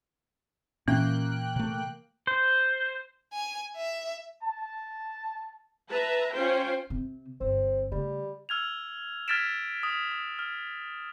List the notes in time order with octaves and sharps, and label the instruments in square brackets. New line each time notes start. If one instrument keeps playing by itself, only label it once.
[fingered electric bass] A#2 [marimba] E3 [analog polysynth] A#3 G5 F#6 [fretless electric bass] C#4
[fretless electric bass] C3 A3
[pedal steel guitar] C5
[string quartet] G#5
E5
[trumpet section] A5
[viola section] B4 E5 A5 A#5
C#4 F4 C5 G5
[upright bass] C3 C4
[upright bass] G1 [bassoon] C4
[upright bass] C#3 A3 [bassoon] G3
[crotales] E6 F6 G#6 F7
F6 G#6 A6 B6 D7 E7
D#6
D#6
F6